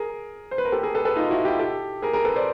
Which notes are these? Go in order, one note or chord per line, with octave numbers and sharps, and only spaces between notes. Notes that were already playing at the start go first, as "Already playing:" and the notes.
Already playing: G#4 A#4
C5
B4
A#4
G4 A4
G#4 A#4
A4 B4
A4 B4
D#4 F4
E4 F#4
F4 G4
G4 A4
G#4 A#4
G#4 A#4
A4 B4
C5 D5